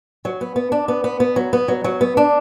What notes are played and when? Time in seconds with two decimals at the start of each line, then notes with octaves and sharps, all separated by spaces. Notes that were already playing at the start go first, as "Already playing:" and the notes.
0.25 F#3
0.41 B3
0.56 B3
0.72 D4
0.88 B3
1.04 B3
1.20 B3
1.36 F#3
1.53 B3
1.68 F#3
1.84 F#3
2.01 B3
2.17 D4